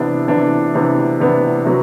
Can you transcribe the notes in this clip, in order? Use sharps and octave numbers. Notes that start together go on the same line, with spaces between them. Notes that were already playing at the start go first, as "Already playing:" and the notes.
Already playing: C3 E3 B3 D4
C3 E3 B3 D4
C3 E3 B3 D4
C3 E3 B3 D4
C3 F#3 B3